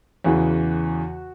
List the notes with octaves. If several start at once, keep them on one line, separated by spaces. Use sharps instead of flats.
E2 C#3 E3 F#4